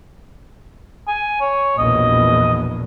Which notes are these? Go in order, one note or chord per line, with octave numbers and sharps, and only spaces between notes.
G#5
C#5
A#1 E2 B2 D#5